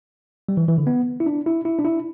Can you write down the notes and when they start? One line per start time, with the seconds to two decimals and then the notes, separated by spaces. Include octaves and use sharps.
0.49 G3
0.57 E3
0.68 E3
0.78 D3
0.87 B3
1.20 E4
1.26 D4
1.46 E4
1.65 E4
1.79 D4
1.85 E4